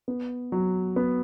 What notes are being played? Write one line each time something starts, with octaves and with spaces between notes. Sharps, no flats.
B3
F#3
B3